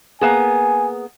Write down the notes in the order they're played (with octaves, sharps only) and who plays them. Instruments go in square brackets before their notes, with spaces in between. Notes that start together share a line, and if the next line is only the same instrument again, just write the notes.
[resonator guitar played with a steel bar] A#3 B3 G#4 [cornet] G#5